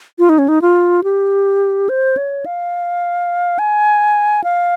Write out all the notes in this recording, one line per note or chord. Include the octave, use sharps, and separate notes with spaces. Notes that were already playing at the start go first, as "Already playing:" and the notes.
F4
D#4
C#4
D#4
F4
G4
C5
C#5
F5
G#5
F5